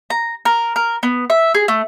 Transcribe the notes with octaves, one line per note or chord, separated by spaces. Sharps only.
A#5
A#4
A#4
B3
E5
G#4
A3